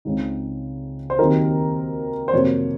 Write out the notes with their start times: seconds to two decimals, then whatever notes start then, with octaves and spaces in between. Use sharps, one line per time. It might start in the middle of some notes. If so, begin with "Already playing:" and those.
0.05 C#2 C#3 G#3 C4 D#4
1.10 C5
1.19 D#2 D#3 F#3 C4 D#4 A#4
2.28 C5
2.33 F2 C3 F#3 A#3 C#5